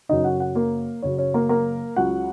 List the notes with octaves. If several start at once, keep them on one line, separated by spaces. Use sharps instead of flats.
F#2 C#3 F#3 D#4 D#5
F#4 F#5
F#4 F#5
A#3 A#4
F#2 C#3 F#3 C#4 C#5
C#4 C#5
A#3 A#4
A#3 A#4
C#2 C#3 F#3 F#4 F#5